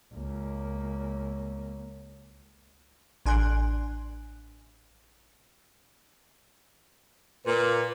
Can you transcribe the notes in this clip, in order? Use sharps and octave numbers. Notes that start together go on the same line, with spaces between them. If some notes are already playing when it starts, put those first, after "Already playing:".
C#2 A#3
A1 D4 G#5 C6 F#6
A#2 B4